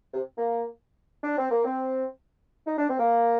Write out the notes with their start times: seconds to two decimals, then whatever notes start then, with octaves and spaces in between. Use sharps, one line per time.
0.13 C3
0.36 A#3
1.24 D4
1.37 C4
1.51 A#3
1.65 C4
2.67 D#4
2.78 D4
2.89 C4
2.99 A#3